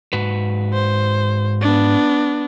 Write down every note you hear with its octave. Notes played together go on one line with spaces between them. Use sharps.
G#2 F#4 B4
C5
B3 D4